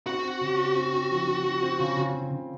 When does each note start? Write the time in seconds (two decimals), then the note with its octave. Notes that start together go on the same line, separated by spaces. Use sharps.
0.06 C4 F#4
0.24 C4
0.41 C#3
0.58 C4
0.76 C4
0.93 C4
1.11 F3
1.27 F3
1.44 F3
1.63 C4
1.79 C#3
1.96 C#3
2.13 C#3
2.30 C#3